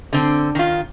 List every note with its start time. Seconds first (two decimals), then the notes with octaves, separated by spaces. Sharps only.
0.13 D3 C4
0.55 D#3 F4